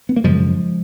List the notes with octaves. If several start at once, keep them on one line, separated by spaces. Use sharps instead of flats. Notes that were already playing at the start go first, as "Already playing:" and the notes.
B3
A#3
F#2 C#3 F3 G#3